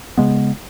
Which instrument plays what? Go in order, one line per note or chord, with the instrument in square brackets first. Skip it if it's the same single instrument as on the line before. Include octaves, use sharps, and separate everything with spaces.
[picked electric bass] C#3 G#3 B3